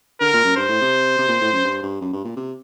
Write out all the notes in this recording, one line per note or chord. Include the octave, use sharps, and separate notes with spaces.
D3 A#4
A#2
F#2
G2 C5
A2
C3
C3
A#2
A2
F#2
G2
G2
F#2
G2
A#2
C3